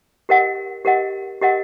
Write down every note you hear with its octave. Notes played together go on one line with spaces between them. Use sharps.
G4 A#4 D#5 F#5
G4 A#4 D#5 F#5
G4 A#4 D#5 F#5